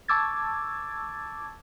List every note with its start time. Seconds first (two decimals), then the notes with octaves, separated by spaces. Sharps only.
0.08 A5 C#6 D6 E6 G#6 A6